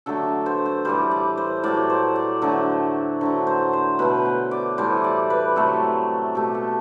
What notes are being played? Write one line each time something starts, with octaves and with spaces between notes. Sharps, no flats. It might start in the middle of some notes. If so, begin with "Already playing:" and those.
D3 F#3 A3 A4
C5
C5
A2 E3 G3 C5
D5
C5
A2 F#3 A3 D5
C5
D5
D3 F#3 A3 C5
D3 F#3 A3 C5
C5
C5
B2 A3 B4
C5
D5
A2 E3 G3 C5
D5
B4
C3 F#3 A3 A4
B2 A3 G4
A4